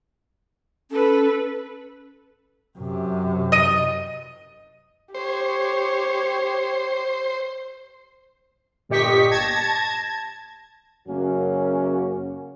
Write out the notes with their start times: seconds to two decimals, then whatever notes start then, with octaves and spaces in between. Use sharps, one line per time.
0.90 C#4 A4 B4
2.79 F#2 C3
3.52 D#5 D#7
5.15 G4 C5 C#5
8.89 G1 A#2 G4 D#5 C#6 B6
9.31 A5 G#6 A#6
11.07 F#2 C#3 A#3 C#4 F#4